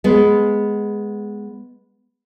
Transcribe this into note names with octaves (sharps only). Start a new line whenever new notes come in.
G#3 B3